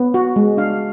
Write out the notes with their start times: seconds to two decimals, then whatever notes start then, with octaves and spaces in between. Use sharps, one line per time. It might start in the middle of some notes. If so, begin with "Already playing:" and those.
Already playing: B3
0.14 F#4
0.36 G#3
0.57 D4 F5